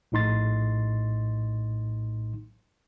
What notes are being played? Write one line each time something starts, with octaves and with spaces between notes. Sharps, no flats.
A#1 A2 D#4 C6 A6